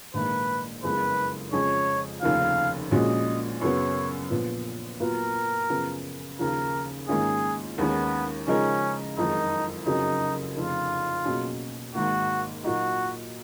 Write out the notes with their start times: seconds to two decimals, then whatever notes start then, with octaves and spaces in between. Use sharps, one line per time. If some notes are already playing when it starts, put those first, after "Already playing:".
0.14 A#1 G#2 D#3 A#3 B4
0.83 F#1 F2 C#3 G#3 B3 B4
1.53 F2 C#3 F3 G#3 C#4 C#5
2.22 F1 D#2 C#3 F3 F5
2.91 A#1 A#2 G#3 C#4 F#4 D#5
3.61 F#2 C#3 F#3 B3 C#5
4.31 A#1 A#2 F3 B3
5.00 A#2 F#3 B3 F4 A#4 B4
5.70 F#2 C#3 F3 B3
6.39 D#2 C#3 F3 A#4
7.08 G#2 D#3 A#3 C#4 F4 G#4
7.78 D#2 D#3 G#3 B3 C#4
8.47 C#3 F3 G#3 C#4 D#4 A#4
9.17 F#1 F2 D#3 G#3 D#4
9.86 F#1 F2 C#3 F#3 C#4 D#4
10.56 F1 F2 C#3 F4
11.25 B2 F#3 A#3 C#4 G#4
11.95 G#1 G#2 D#3 A#3 F#4
12.64 A#2 F#3 A#3 D#4 F#4